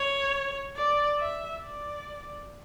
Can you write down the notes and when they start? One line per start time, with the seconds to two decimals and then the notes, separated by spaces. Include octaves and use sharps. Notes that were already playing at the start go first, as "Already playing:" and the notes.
Already playing: C#5
0.76 D5
1.19 E5
1.61 D5